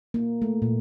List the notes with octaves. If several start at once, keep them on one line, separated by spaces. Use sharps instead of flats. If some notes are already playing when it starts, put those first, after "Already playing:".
A#3
A3
A#2